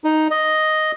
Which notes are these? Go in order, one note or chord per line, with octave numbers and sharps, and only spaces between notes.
D#4
D#5